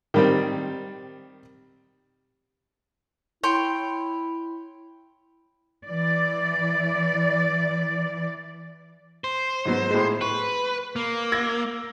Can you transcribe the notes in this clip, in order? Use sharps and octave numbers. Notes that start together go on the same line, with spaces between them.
D#3 G3 C4
E4 C#5 G5 C6
E3 D5
C5
G#2 F#3 B3
A2 G#3
B4 C#6
A#3
E6 G#6 A#6